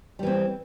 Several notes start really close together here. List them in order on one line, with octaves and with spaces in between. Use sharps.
G3 E3 C4